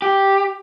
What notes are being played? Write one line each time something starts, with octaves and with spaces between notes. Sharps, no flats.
G4